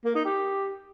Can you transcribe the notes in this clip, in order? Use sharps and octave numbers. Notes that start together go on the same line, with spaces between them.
A#3
D#4
G4